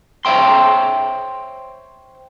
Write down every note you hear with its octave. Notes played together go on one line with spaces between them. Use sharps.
C5 C#5 E5 G5 C6